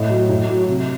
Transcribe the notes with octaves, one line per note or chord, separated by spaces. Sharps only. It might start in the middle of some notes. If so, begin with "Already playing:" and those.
Already playing: A2 D#5
F#3
A2
F#3
C3